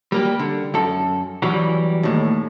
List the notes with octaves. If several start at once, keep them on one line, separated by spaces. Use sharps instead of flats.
G3 A#3 G4
D3
F#2 A4
E2 E3 F#3 G3
D#2 A2